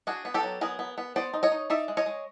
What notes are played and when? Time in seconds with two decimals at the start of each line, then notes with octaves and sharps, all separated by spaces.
0.07 D4 F#4 G#4
0.25 B3
0.34 G4 A4
0.43 F#3
0.61 B3 G#4 A#4
0.79 B3
0.98 B3
1.16 B3 C5 D5
1.34 D#4
1.43 C#5 D#5
1.52 D#4
1.70 D#4 D5 E5
1.88 G#3
1.97 C#5 D#5
2.06 G#3